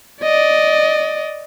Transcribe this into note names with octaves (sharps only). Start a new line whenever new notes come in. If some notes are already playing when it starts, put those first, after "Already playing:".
D5 D#5